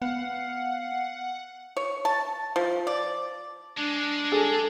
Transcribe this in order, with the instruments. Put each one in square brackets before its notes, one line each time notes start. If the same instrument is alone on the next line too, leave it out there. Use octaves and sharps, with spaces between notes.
[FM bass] B3 [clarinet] F5 [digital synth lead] F#5
[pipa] C#5
A5
F3
D5
[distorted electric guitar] G#3 [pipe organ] D4
[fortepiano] G#4 [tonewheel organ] A4